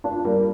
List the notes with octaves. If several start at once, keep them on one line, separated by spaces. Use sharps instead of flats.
D4 F4
G3 A#3